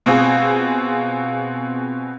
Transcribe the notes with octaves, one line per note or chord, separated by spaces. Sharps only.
B2 C4 F4 G#4